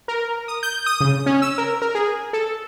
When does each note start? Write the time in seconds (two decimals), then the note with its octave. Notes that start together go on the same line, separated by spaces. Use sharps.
0.08 A#4
0.48 D#6
0.63 G6
0.86 D#6
1.00 C#3
1.26 C#4
1.42 E6
1.58 A#4
1.82 A#4
1.95 G#4
2.33 A4